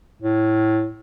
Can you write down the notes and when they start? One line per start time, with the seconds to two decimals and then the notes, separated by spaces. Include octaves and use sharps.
0.22 A2